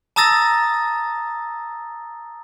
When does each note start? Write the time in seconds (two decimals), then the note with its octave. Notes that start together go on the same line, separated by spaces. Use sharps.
0.16 A5 A#5 D#6 E6 A6 A#6